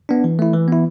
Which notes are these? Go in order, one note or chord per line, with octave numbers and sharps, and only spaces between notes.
B3 D4
E3
A3 E4
E3
B3 E4